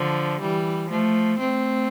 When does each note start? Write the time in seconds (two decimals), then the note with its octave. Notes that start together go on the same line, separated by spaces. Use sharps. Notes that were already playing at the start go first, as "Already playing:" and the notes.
Already playing: D3 F3
0.41 E3 G3
0.90 F3 A3
1.39 A3 C4